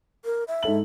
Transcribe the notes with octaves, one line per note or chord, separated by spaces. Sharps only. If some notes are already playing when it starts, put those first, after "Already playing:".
A#4
E5
G#2 A4 F#7